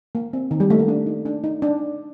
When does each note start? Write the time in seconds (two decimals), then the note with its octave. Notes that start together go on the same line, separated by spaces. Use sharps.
0.15 A#3
0.33 C4
0.51 D#3
0.60 G3
0.70 A3
0.79 A#3
0.88 D4
1.07 D#4
1.26 D4
1.44 D#4
1.62 D4